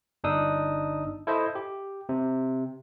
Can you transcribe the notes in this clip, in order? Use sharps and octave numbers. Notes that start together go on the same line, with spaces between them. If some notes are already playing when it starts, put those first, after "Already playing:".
G1 D4 D#4 D#6 E6
E4 A4 C5 D#5 E5
G4
C3